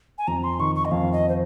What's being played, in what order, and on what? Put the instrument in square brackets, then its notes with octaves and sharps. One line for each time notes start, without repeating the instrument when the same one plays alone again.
[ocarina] G#5
[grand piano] F2 [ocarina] A#5
[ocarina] C6
[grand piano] D#3 [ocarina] C#6
[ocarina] C#6
D#5
[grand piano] F2 [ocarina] F5
[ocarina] D#5
C5